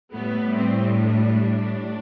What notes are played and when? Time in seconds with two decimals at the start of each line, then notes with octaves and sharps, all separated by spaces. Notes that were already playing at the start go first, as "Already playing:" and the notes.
0.13 A2 G3 B3
0.56 C4
1.00 D4